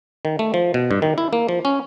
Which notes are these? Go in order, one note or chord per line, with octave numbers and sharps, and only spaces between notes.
D#3
A3
F3
B2
G2
D#3
E4
A#3
F3
C#4